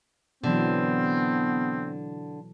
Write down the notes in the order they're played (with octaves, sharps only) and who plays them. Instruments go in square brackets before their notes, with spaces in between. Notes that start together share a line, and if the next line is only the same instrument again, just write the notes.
[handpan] B2 E3 F#3 [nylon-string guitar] D3 [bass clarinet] B3 [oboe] C4